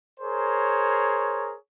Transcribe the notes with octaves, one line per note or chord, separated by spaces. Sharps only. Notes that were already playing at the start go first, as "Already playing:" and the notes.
G#4 A#4 C5 C#5